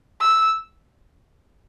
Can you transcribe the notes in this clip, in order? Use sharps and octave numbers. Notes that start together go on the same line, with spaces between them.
E6